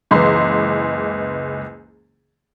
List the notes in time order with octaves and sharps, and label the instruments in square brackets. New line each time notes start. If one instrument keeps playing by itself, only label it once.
[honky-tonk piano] F#1 C#2 E3 C6